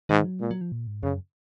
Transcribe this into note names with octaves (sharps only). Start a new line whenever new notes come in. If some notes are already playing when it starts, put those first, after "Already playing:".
G#2 D#3
F#3
A#2 G#3
F#3
F3
A#2
G#2
F#2 C#3